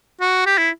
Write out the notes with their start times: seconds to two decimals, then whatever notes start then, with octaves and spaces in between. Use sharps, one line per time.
0.21 F#4
0.46 G4
0.58 E4